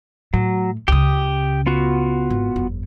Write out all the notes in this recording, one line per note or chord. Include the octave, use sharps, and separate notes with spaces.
A2 F#3
C#2 C#3 G4 D#6
B3 F4 F#4
G#1
G1 F2